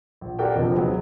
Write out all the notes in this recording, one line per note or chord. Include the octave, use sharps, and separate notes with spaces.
A#1
F#4 G4 A4 A#4 D5 G5
F1 F2 B2 D3 F3
D2 F#3 G#3 B3